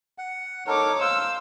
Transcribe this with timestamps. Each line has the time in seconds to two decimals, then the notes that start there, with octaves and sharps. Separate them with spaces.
0.18 F#5
0.67 D#4 A4 A#4 C#5 D6
1.01 C5 F5 C6 E6